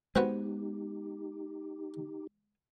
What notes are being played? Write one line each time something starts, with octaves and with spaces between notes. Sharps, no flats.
G#3 B3 C4 D#4 F#4 G4 B4